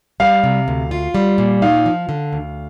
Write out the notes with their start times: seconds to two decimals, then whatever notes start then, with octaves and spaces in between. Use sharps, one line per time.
0.20 G3 F5
0.44 C3
0.68 D2
0.91 F4
1.15 G3
1.38 A#2
1.62 D#4 F5
1.86 F3
2.09 D3
2.33 D2